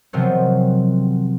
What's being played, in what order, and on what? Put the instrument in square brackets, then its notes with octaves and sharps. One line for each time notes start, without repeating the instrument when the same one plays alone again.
[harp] C3 D#3 F3 F#3 B3 C4